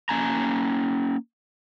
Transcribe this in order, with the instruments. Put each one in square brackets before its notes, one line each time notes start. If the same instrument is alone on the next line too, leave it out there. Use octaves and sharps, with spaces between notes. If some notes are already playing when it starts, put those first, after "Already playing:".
[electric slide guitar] A#3 C#4 G#5 A#5